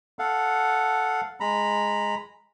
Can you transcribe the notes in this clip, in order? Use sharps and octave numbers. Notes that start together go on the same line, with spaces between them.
A4 F5 F#5
G#3 A#5 B5